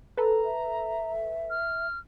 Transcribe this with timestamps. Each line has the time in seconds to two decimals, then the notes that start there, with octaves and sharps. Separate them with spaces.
0.17 A4 B4 A#5
0.45 E5
1.50 F6